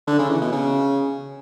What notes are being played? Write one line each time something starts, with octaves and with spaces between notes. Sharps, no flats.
D3
C#3
E3
B2
C#3